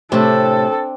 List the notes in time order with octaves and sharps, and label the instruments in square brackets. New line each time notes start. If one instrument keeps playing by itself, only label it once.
[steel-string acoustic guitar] A2 C3 [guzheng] C4 D4 [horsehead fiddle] A4